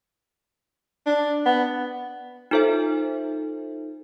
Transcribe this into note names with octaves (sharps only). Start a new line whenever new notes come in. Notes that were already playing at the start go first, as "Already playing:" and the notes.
D4
B3
D#4 F4 A4 C5 E5